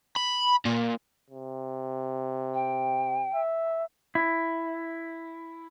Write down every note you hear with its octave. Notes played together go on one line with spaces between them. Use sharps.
B5
A#2
C3
G5
E5
E4